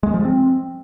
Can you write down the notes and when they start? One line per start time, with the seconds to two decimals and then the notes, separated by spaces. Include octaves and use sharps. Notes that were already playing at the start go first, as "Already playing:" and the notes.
0.03 G#3
0.14 F3
0.25 C4